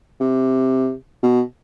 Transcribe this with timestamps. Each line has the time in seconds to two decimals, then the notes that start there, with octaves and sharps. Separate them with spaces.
0.20 C3
1.23 B2